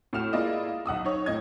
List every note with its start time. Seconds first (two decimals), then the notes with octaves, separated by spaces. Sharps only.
0.13 A2 F#4 F6 E7
0.33 G#3 A#3 E4 F4 D5 D#5
0.86 B1 F#5 D#6 E6
1.05 D#4 C#5
1.26 A2 D#5 G#6